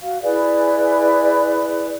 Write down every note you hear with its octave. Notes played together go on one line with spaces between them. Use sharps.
F#4 F5
E4 G#4 B4 D5